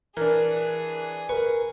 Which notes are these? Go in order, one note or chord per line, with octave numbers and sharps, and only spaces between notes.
E3 D4 G#4 A#4
A#4 B4 C#6